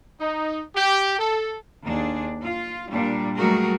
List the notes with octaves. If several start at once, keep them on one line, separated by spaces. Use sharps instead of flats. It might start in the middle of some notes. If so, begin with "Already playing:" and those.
D#4
G4
A4
D#2 D4 G#4
F4
A#2 G3 D4
F#3 G3 A3 F#4 G#4 A#4